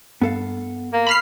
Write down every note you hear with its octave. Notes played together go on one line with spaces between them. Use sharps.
G2 B3 A4 F5
A#3
B5 F6 C7